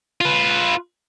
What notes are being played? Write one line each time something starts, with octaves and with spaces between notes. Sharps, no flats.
F4 B4